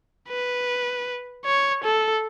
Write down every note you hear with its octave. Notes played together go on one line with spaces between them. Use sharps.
B4
C#5
A4